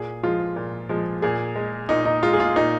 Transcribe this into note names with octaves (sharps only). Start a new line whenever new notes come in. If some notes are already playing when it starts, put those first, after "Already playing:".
Already playing: A#2 G#4
F3 G#3 F4
A#2
F3 G#3
A#2 G#4
G#3
A#2 D#4
D#4
G#3 F4
G#4
F4
A#2 D#4